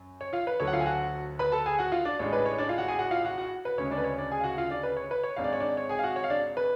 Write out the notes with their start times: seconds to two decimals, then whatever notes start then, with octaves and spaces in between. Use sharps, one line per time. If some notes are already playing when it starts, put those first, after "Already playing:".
Already playing: F#2
0.21 C#5
0.33 F4 F5
0.47 B4
0.60 D2 D3 F#3 C#5
0.67 F#5
0.73 F4 F5
0.80 G#5
0.86 F#4 F#5
1.39 B4 B5
1.52 A4 A5
1.66 G#4 G#5
1.78 F#4 F#5
1.92 F4 F5
2.05 D4 D5
2.19 A1 A2 G#3 D4 C#5
2.33 B4
2.46 C#5
2.58 D4 D5
2.69 F4 F5
2.78 F#4 F#5
2.88 G#4 G#5
2.99 F#4 F#5
3.11 F4 F5
3.25 F#4 F#5
3.38 F#4 F#5
3.65 B4
3.77 D2 C#3 G#3 C#5
3.91 D4 D5
3.98 B4
4.04 C#5
4.18 D4 D5
4.31 G#4 G#5
4.40 F5
4.44 F#4 F#5
4.58 F4 F5
4.70 D4 D5
4.83 B4
4.97 C#5
5.11 B4
5.23 C#5
5.36 G#1 G#2 G#3 D4 F5
5.44 D5
5.53 C#5
5.60 D4 D5
5.77 C#5
5.89 G#4 G#5
5.99 F5
6.04 F#4 F#5
6.16 C#5
6.24 F5
6.30 D4 D5
6.57 B4